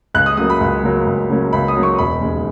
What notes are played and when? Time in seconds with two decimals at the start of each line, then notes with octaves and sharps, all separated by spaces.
0.15 C#2 F#6
0.26 D#6
0.37 C#3 F#3 A#3 C#4 D#6
0.50 B5
0.61 C#2
0.83 C#3 F#3 A#3 C#4
1.07 C#2
1.30 C#3 F#3 A#3 C#4
1.53 C#2 B5
1.68 D#6
1.76 C#3 F#3 A#3 C#4
1.83 C#6
1.98 E1 B5
2.21 D#2 C#3 G#3